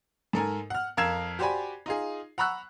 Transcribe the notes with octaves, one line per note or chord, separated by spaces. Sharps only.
G#2 A4 A#4 G#5
F#5 F6
F2 A#4 F5 E6 G#6 E7
F#4 G4 C5 D5 G#5 B5
D#4 F4 G#4
F#5 A#5 B5 C#6 E6 F#6